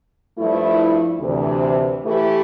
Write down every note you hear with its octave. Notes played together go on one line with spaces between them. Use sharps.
G2 F3 A3 E4
D2 C3 E3
E3 A3 E4 G4